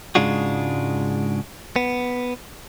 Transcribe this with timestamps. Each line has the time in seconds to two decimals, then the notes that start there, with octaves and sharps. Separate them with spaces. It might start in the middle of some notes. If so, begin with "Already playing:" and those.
0.15 G#2 C#3 G#3 D4 F4 F#4
1.76 B3